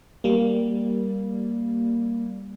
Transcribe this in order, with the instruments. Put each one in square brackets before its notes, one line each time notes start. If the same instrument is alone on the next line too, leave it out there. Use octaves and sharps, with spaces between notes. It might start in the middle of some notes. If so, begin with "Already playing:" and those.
[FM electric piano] G3 A#3